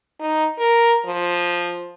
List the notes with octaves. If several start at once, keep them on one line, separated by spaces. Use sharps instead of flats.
D#4
A#4
F3